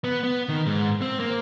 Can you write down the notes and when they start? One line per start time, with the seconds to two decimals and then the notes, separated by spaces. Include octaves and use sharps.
0.04 B3
0.23 B3
0.49 D#3
0.66 G#2
1.01 C4
1.20 A#3